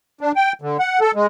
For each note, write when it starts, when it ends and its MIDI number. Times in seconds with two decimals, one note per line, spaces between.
0.21 0.32 62
0.36 0.53 79
0.62 0.77 50
0.79 1.00 78
1.01 1.11 69
1.15 1.27 56